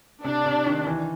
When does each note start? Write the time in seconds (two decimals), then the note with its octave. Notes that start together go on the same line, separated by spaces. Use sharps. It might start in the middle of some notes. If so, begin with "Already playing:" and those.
0.24 C3 D4
0.45 C3
0.66 D#3
0.87 E3